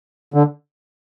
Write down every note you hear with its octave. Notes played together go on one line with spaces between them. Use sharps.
D3